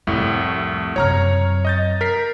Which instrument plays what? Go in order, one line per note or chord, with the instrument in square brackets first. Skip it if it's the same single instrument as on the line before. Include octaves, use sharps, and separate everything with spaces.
[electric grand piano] C2 A2 A3 [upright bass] F2
[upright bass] F#2 C3 [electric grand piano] C#5 A#5 F6
[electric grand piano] D#5 G6 A6
A#4 B6 C7